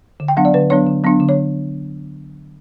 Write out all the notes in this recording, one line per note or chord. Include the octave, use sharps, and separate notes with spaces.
D3
G5
F#3 B3 D4 F#5
D5
D3 B4
F#3 B3 D4 C#5
D3
F#3 B3 D4
D3
C#5